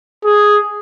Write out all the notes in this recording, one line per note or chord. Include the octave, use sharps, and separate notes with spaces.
G#4